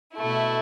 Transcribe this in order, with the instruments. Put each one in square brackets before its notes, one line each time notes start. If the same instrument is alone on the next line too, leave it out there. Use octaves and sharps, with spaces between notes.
[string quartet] B2 A3 E4